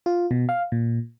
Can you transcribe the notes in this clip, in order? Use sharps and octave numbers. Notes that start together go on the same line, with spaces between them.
F4
B2
F5
A#2